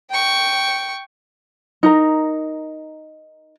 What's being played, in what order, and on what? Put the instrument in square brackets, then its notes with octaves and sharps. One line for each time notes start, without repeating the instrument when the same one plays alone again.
[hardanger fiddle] G5 C#6
[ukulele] D#4 A#4 A#5